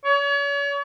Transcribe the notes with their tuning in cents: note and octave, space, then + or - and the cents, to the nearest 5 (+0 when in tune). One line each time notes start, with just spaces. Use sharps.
C#5 +40